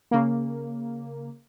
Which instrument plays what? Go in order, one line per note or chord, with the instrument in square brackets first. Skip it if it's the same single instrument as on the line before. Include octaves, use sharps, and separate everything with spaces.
[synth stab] C#3 A#3